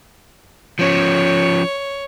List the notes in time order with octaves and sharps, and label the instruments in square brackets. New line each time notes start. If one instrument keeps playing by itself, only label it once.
[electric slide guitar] F3 C#4 [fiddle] C#5